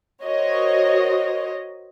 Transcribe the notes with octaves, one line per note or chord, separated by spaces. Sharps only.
F#4 A#4 C5 C#5 D#5